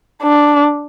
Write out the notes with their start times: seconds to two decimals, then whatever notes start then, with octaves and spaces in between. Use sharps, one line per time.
0.23 D4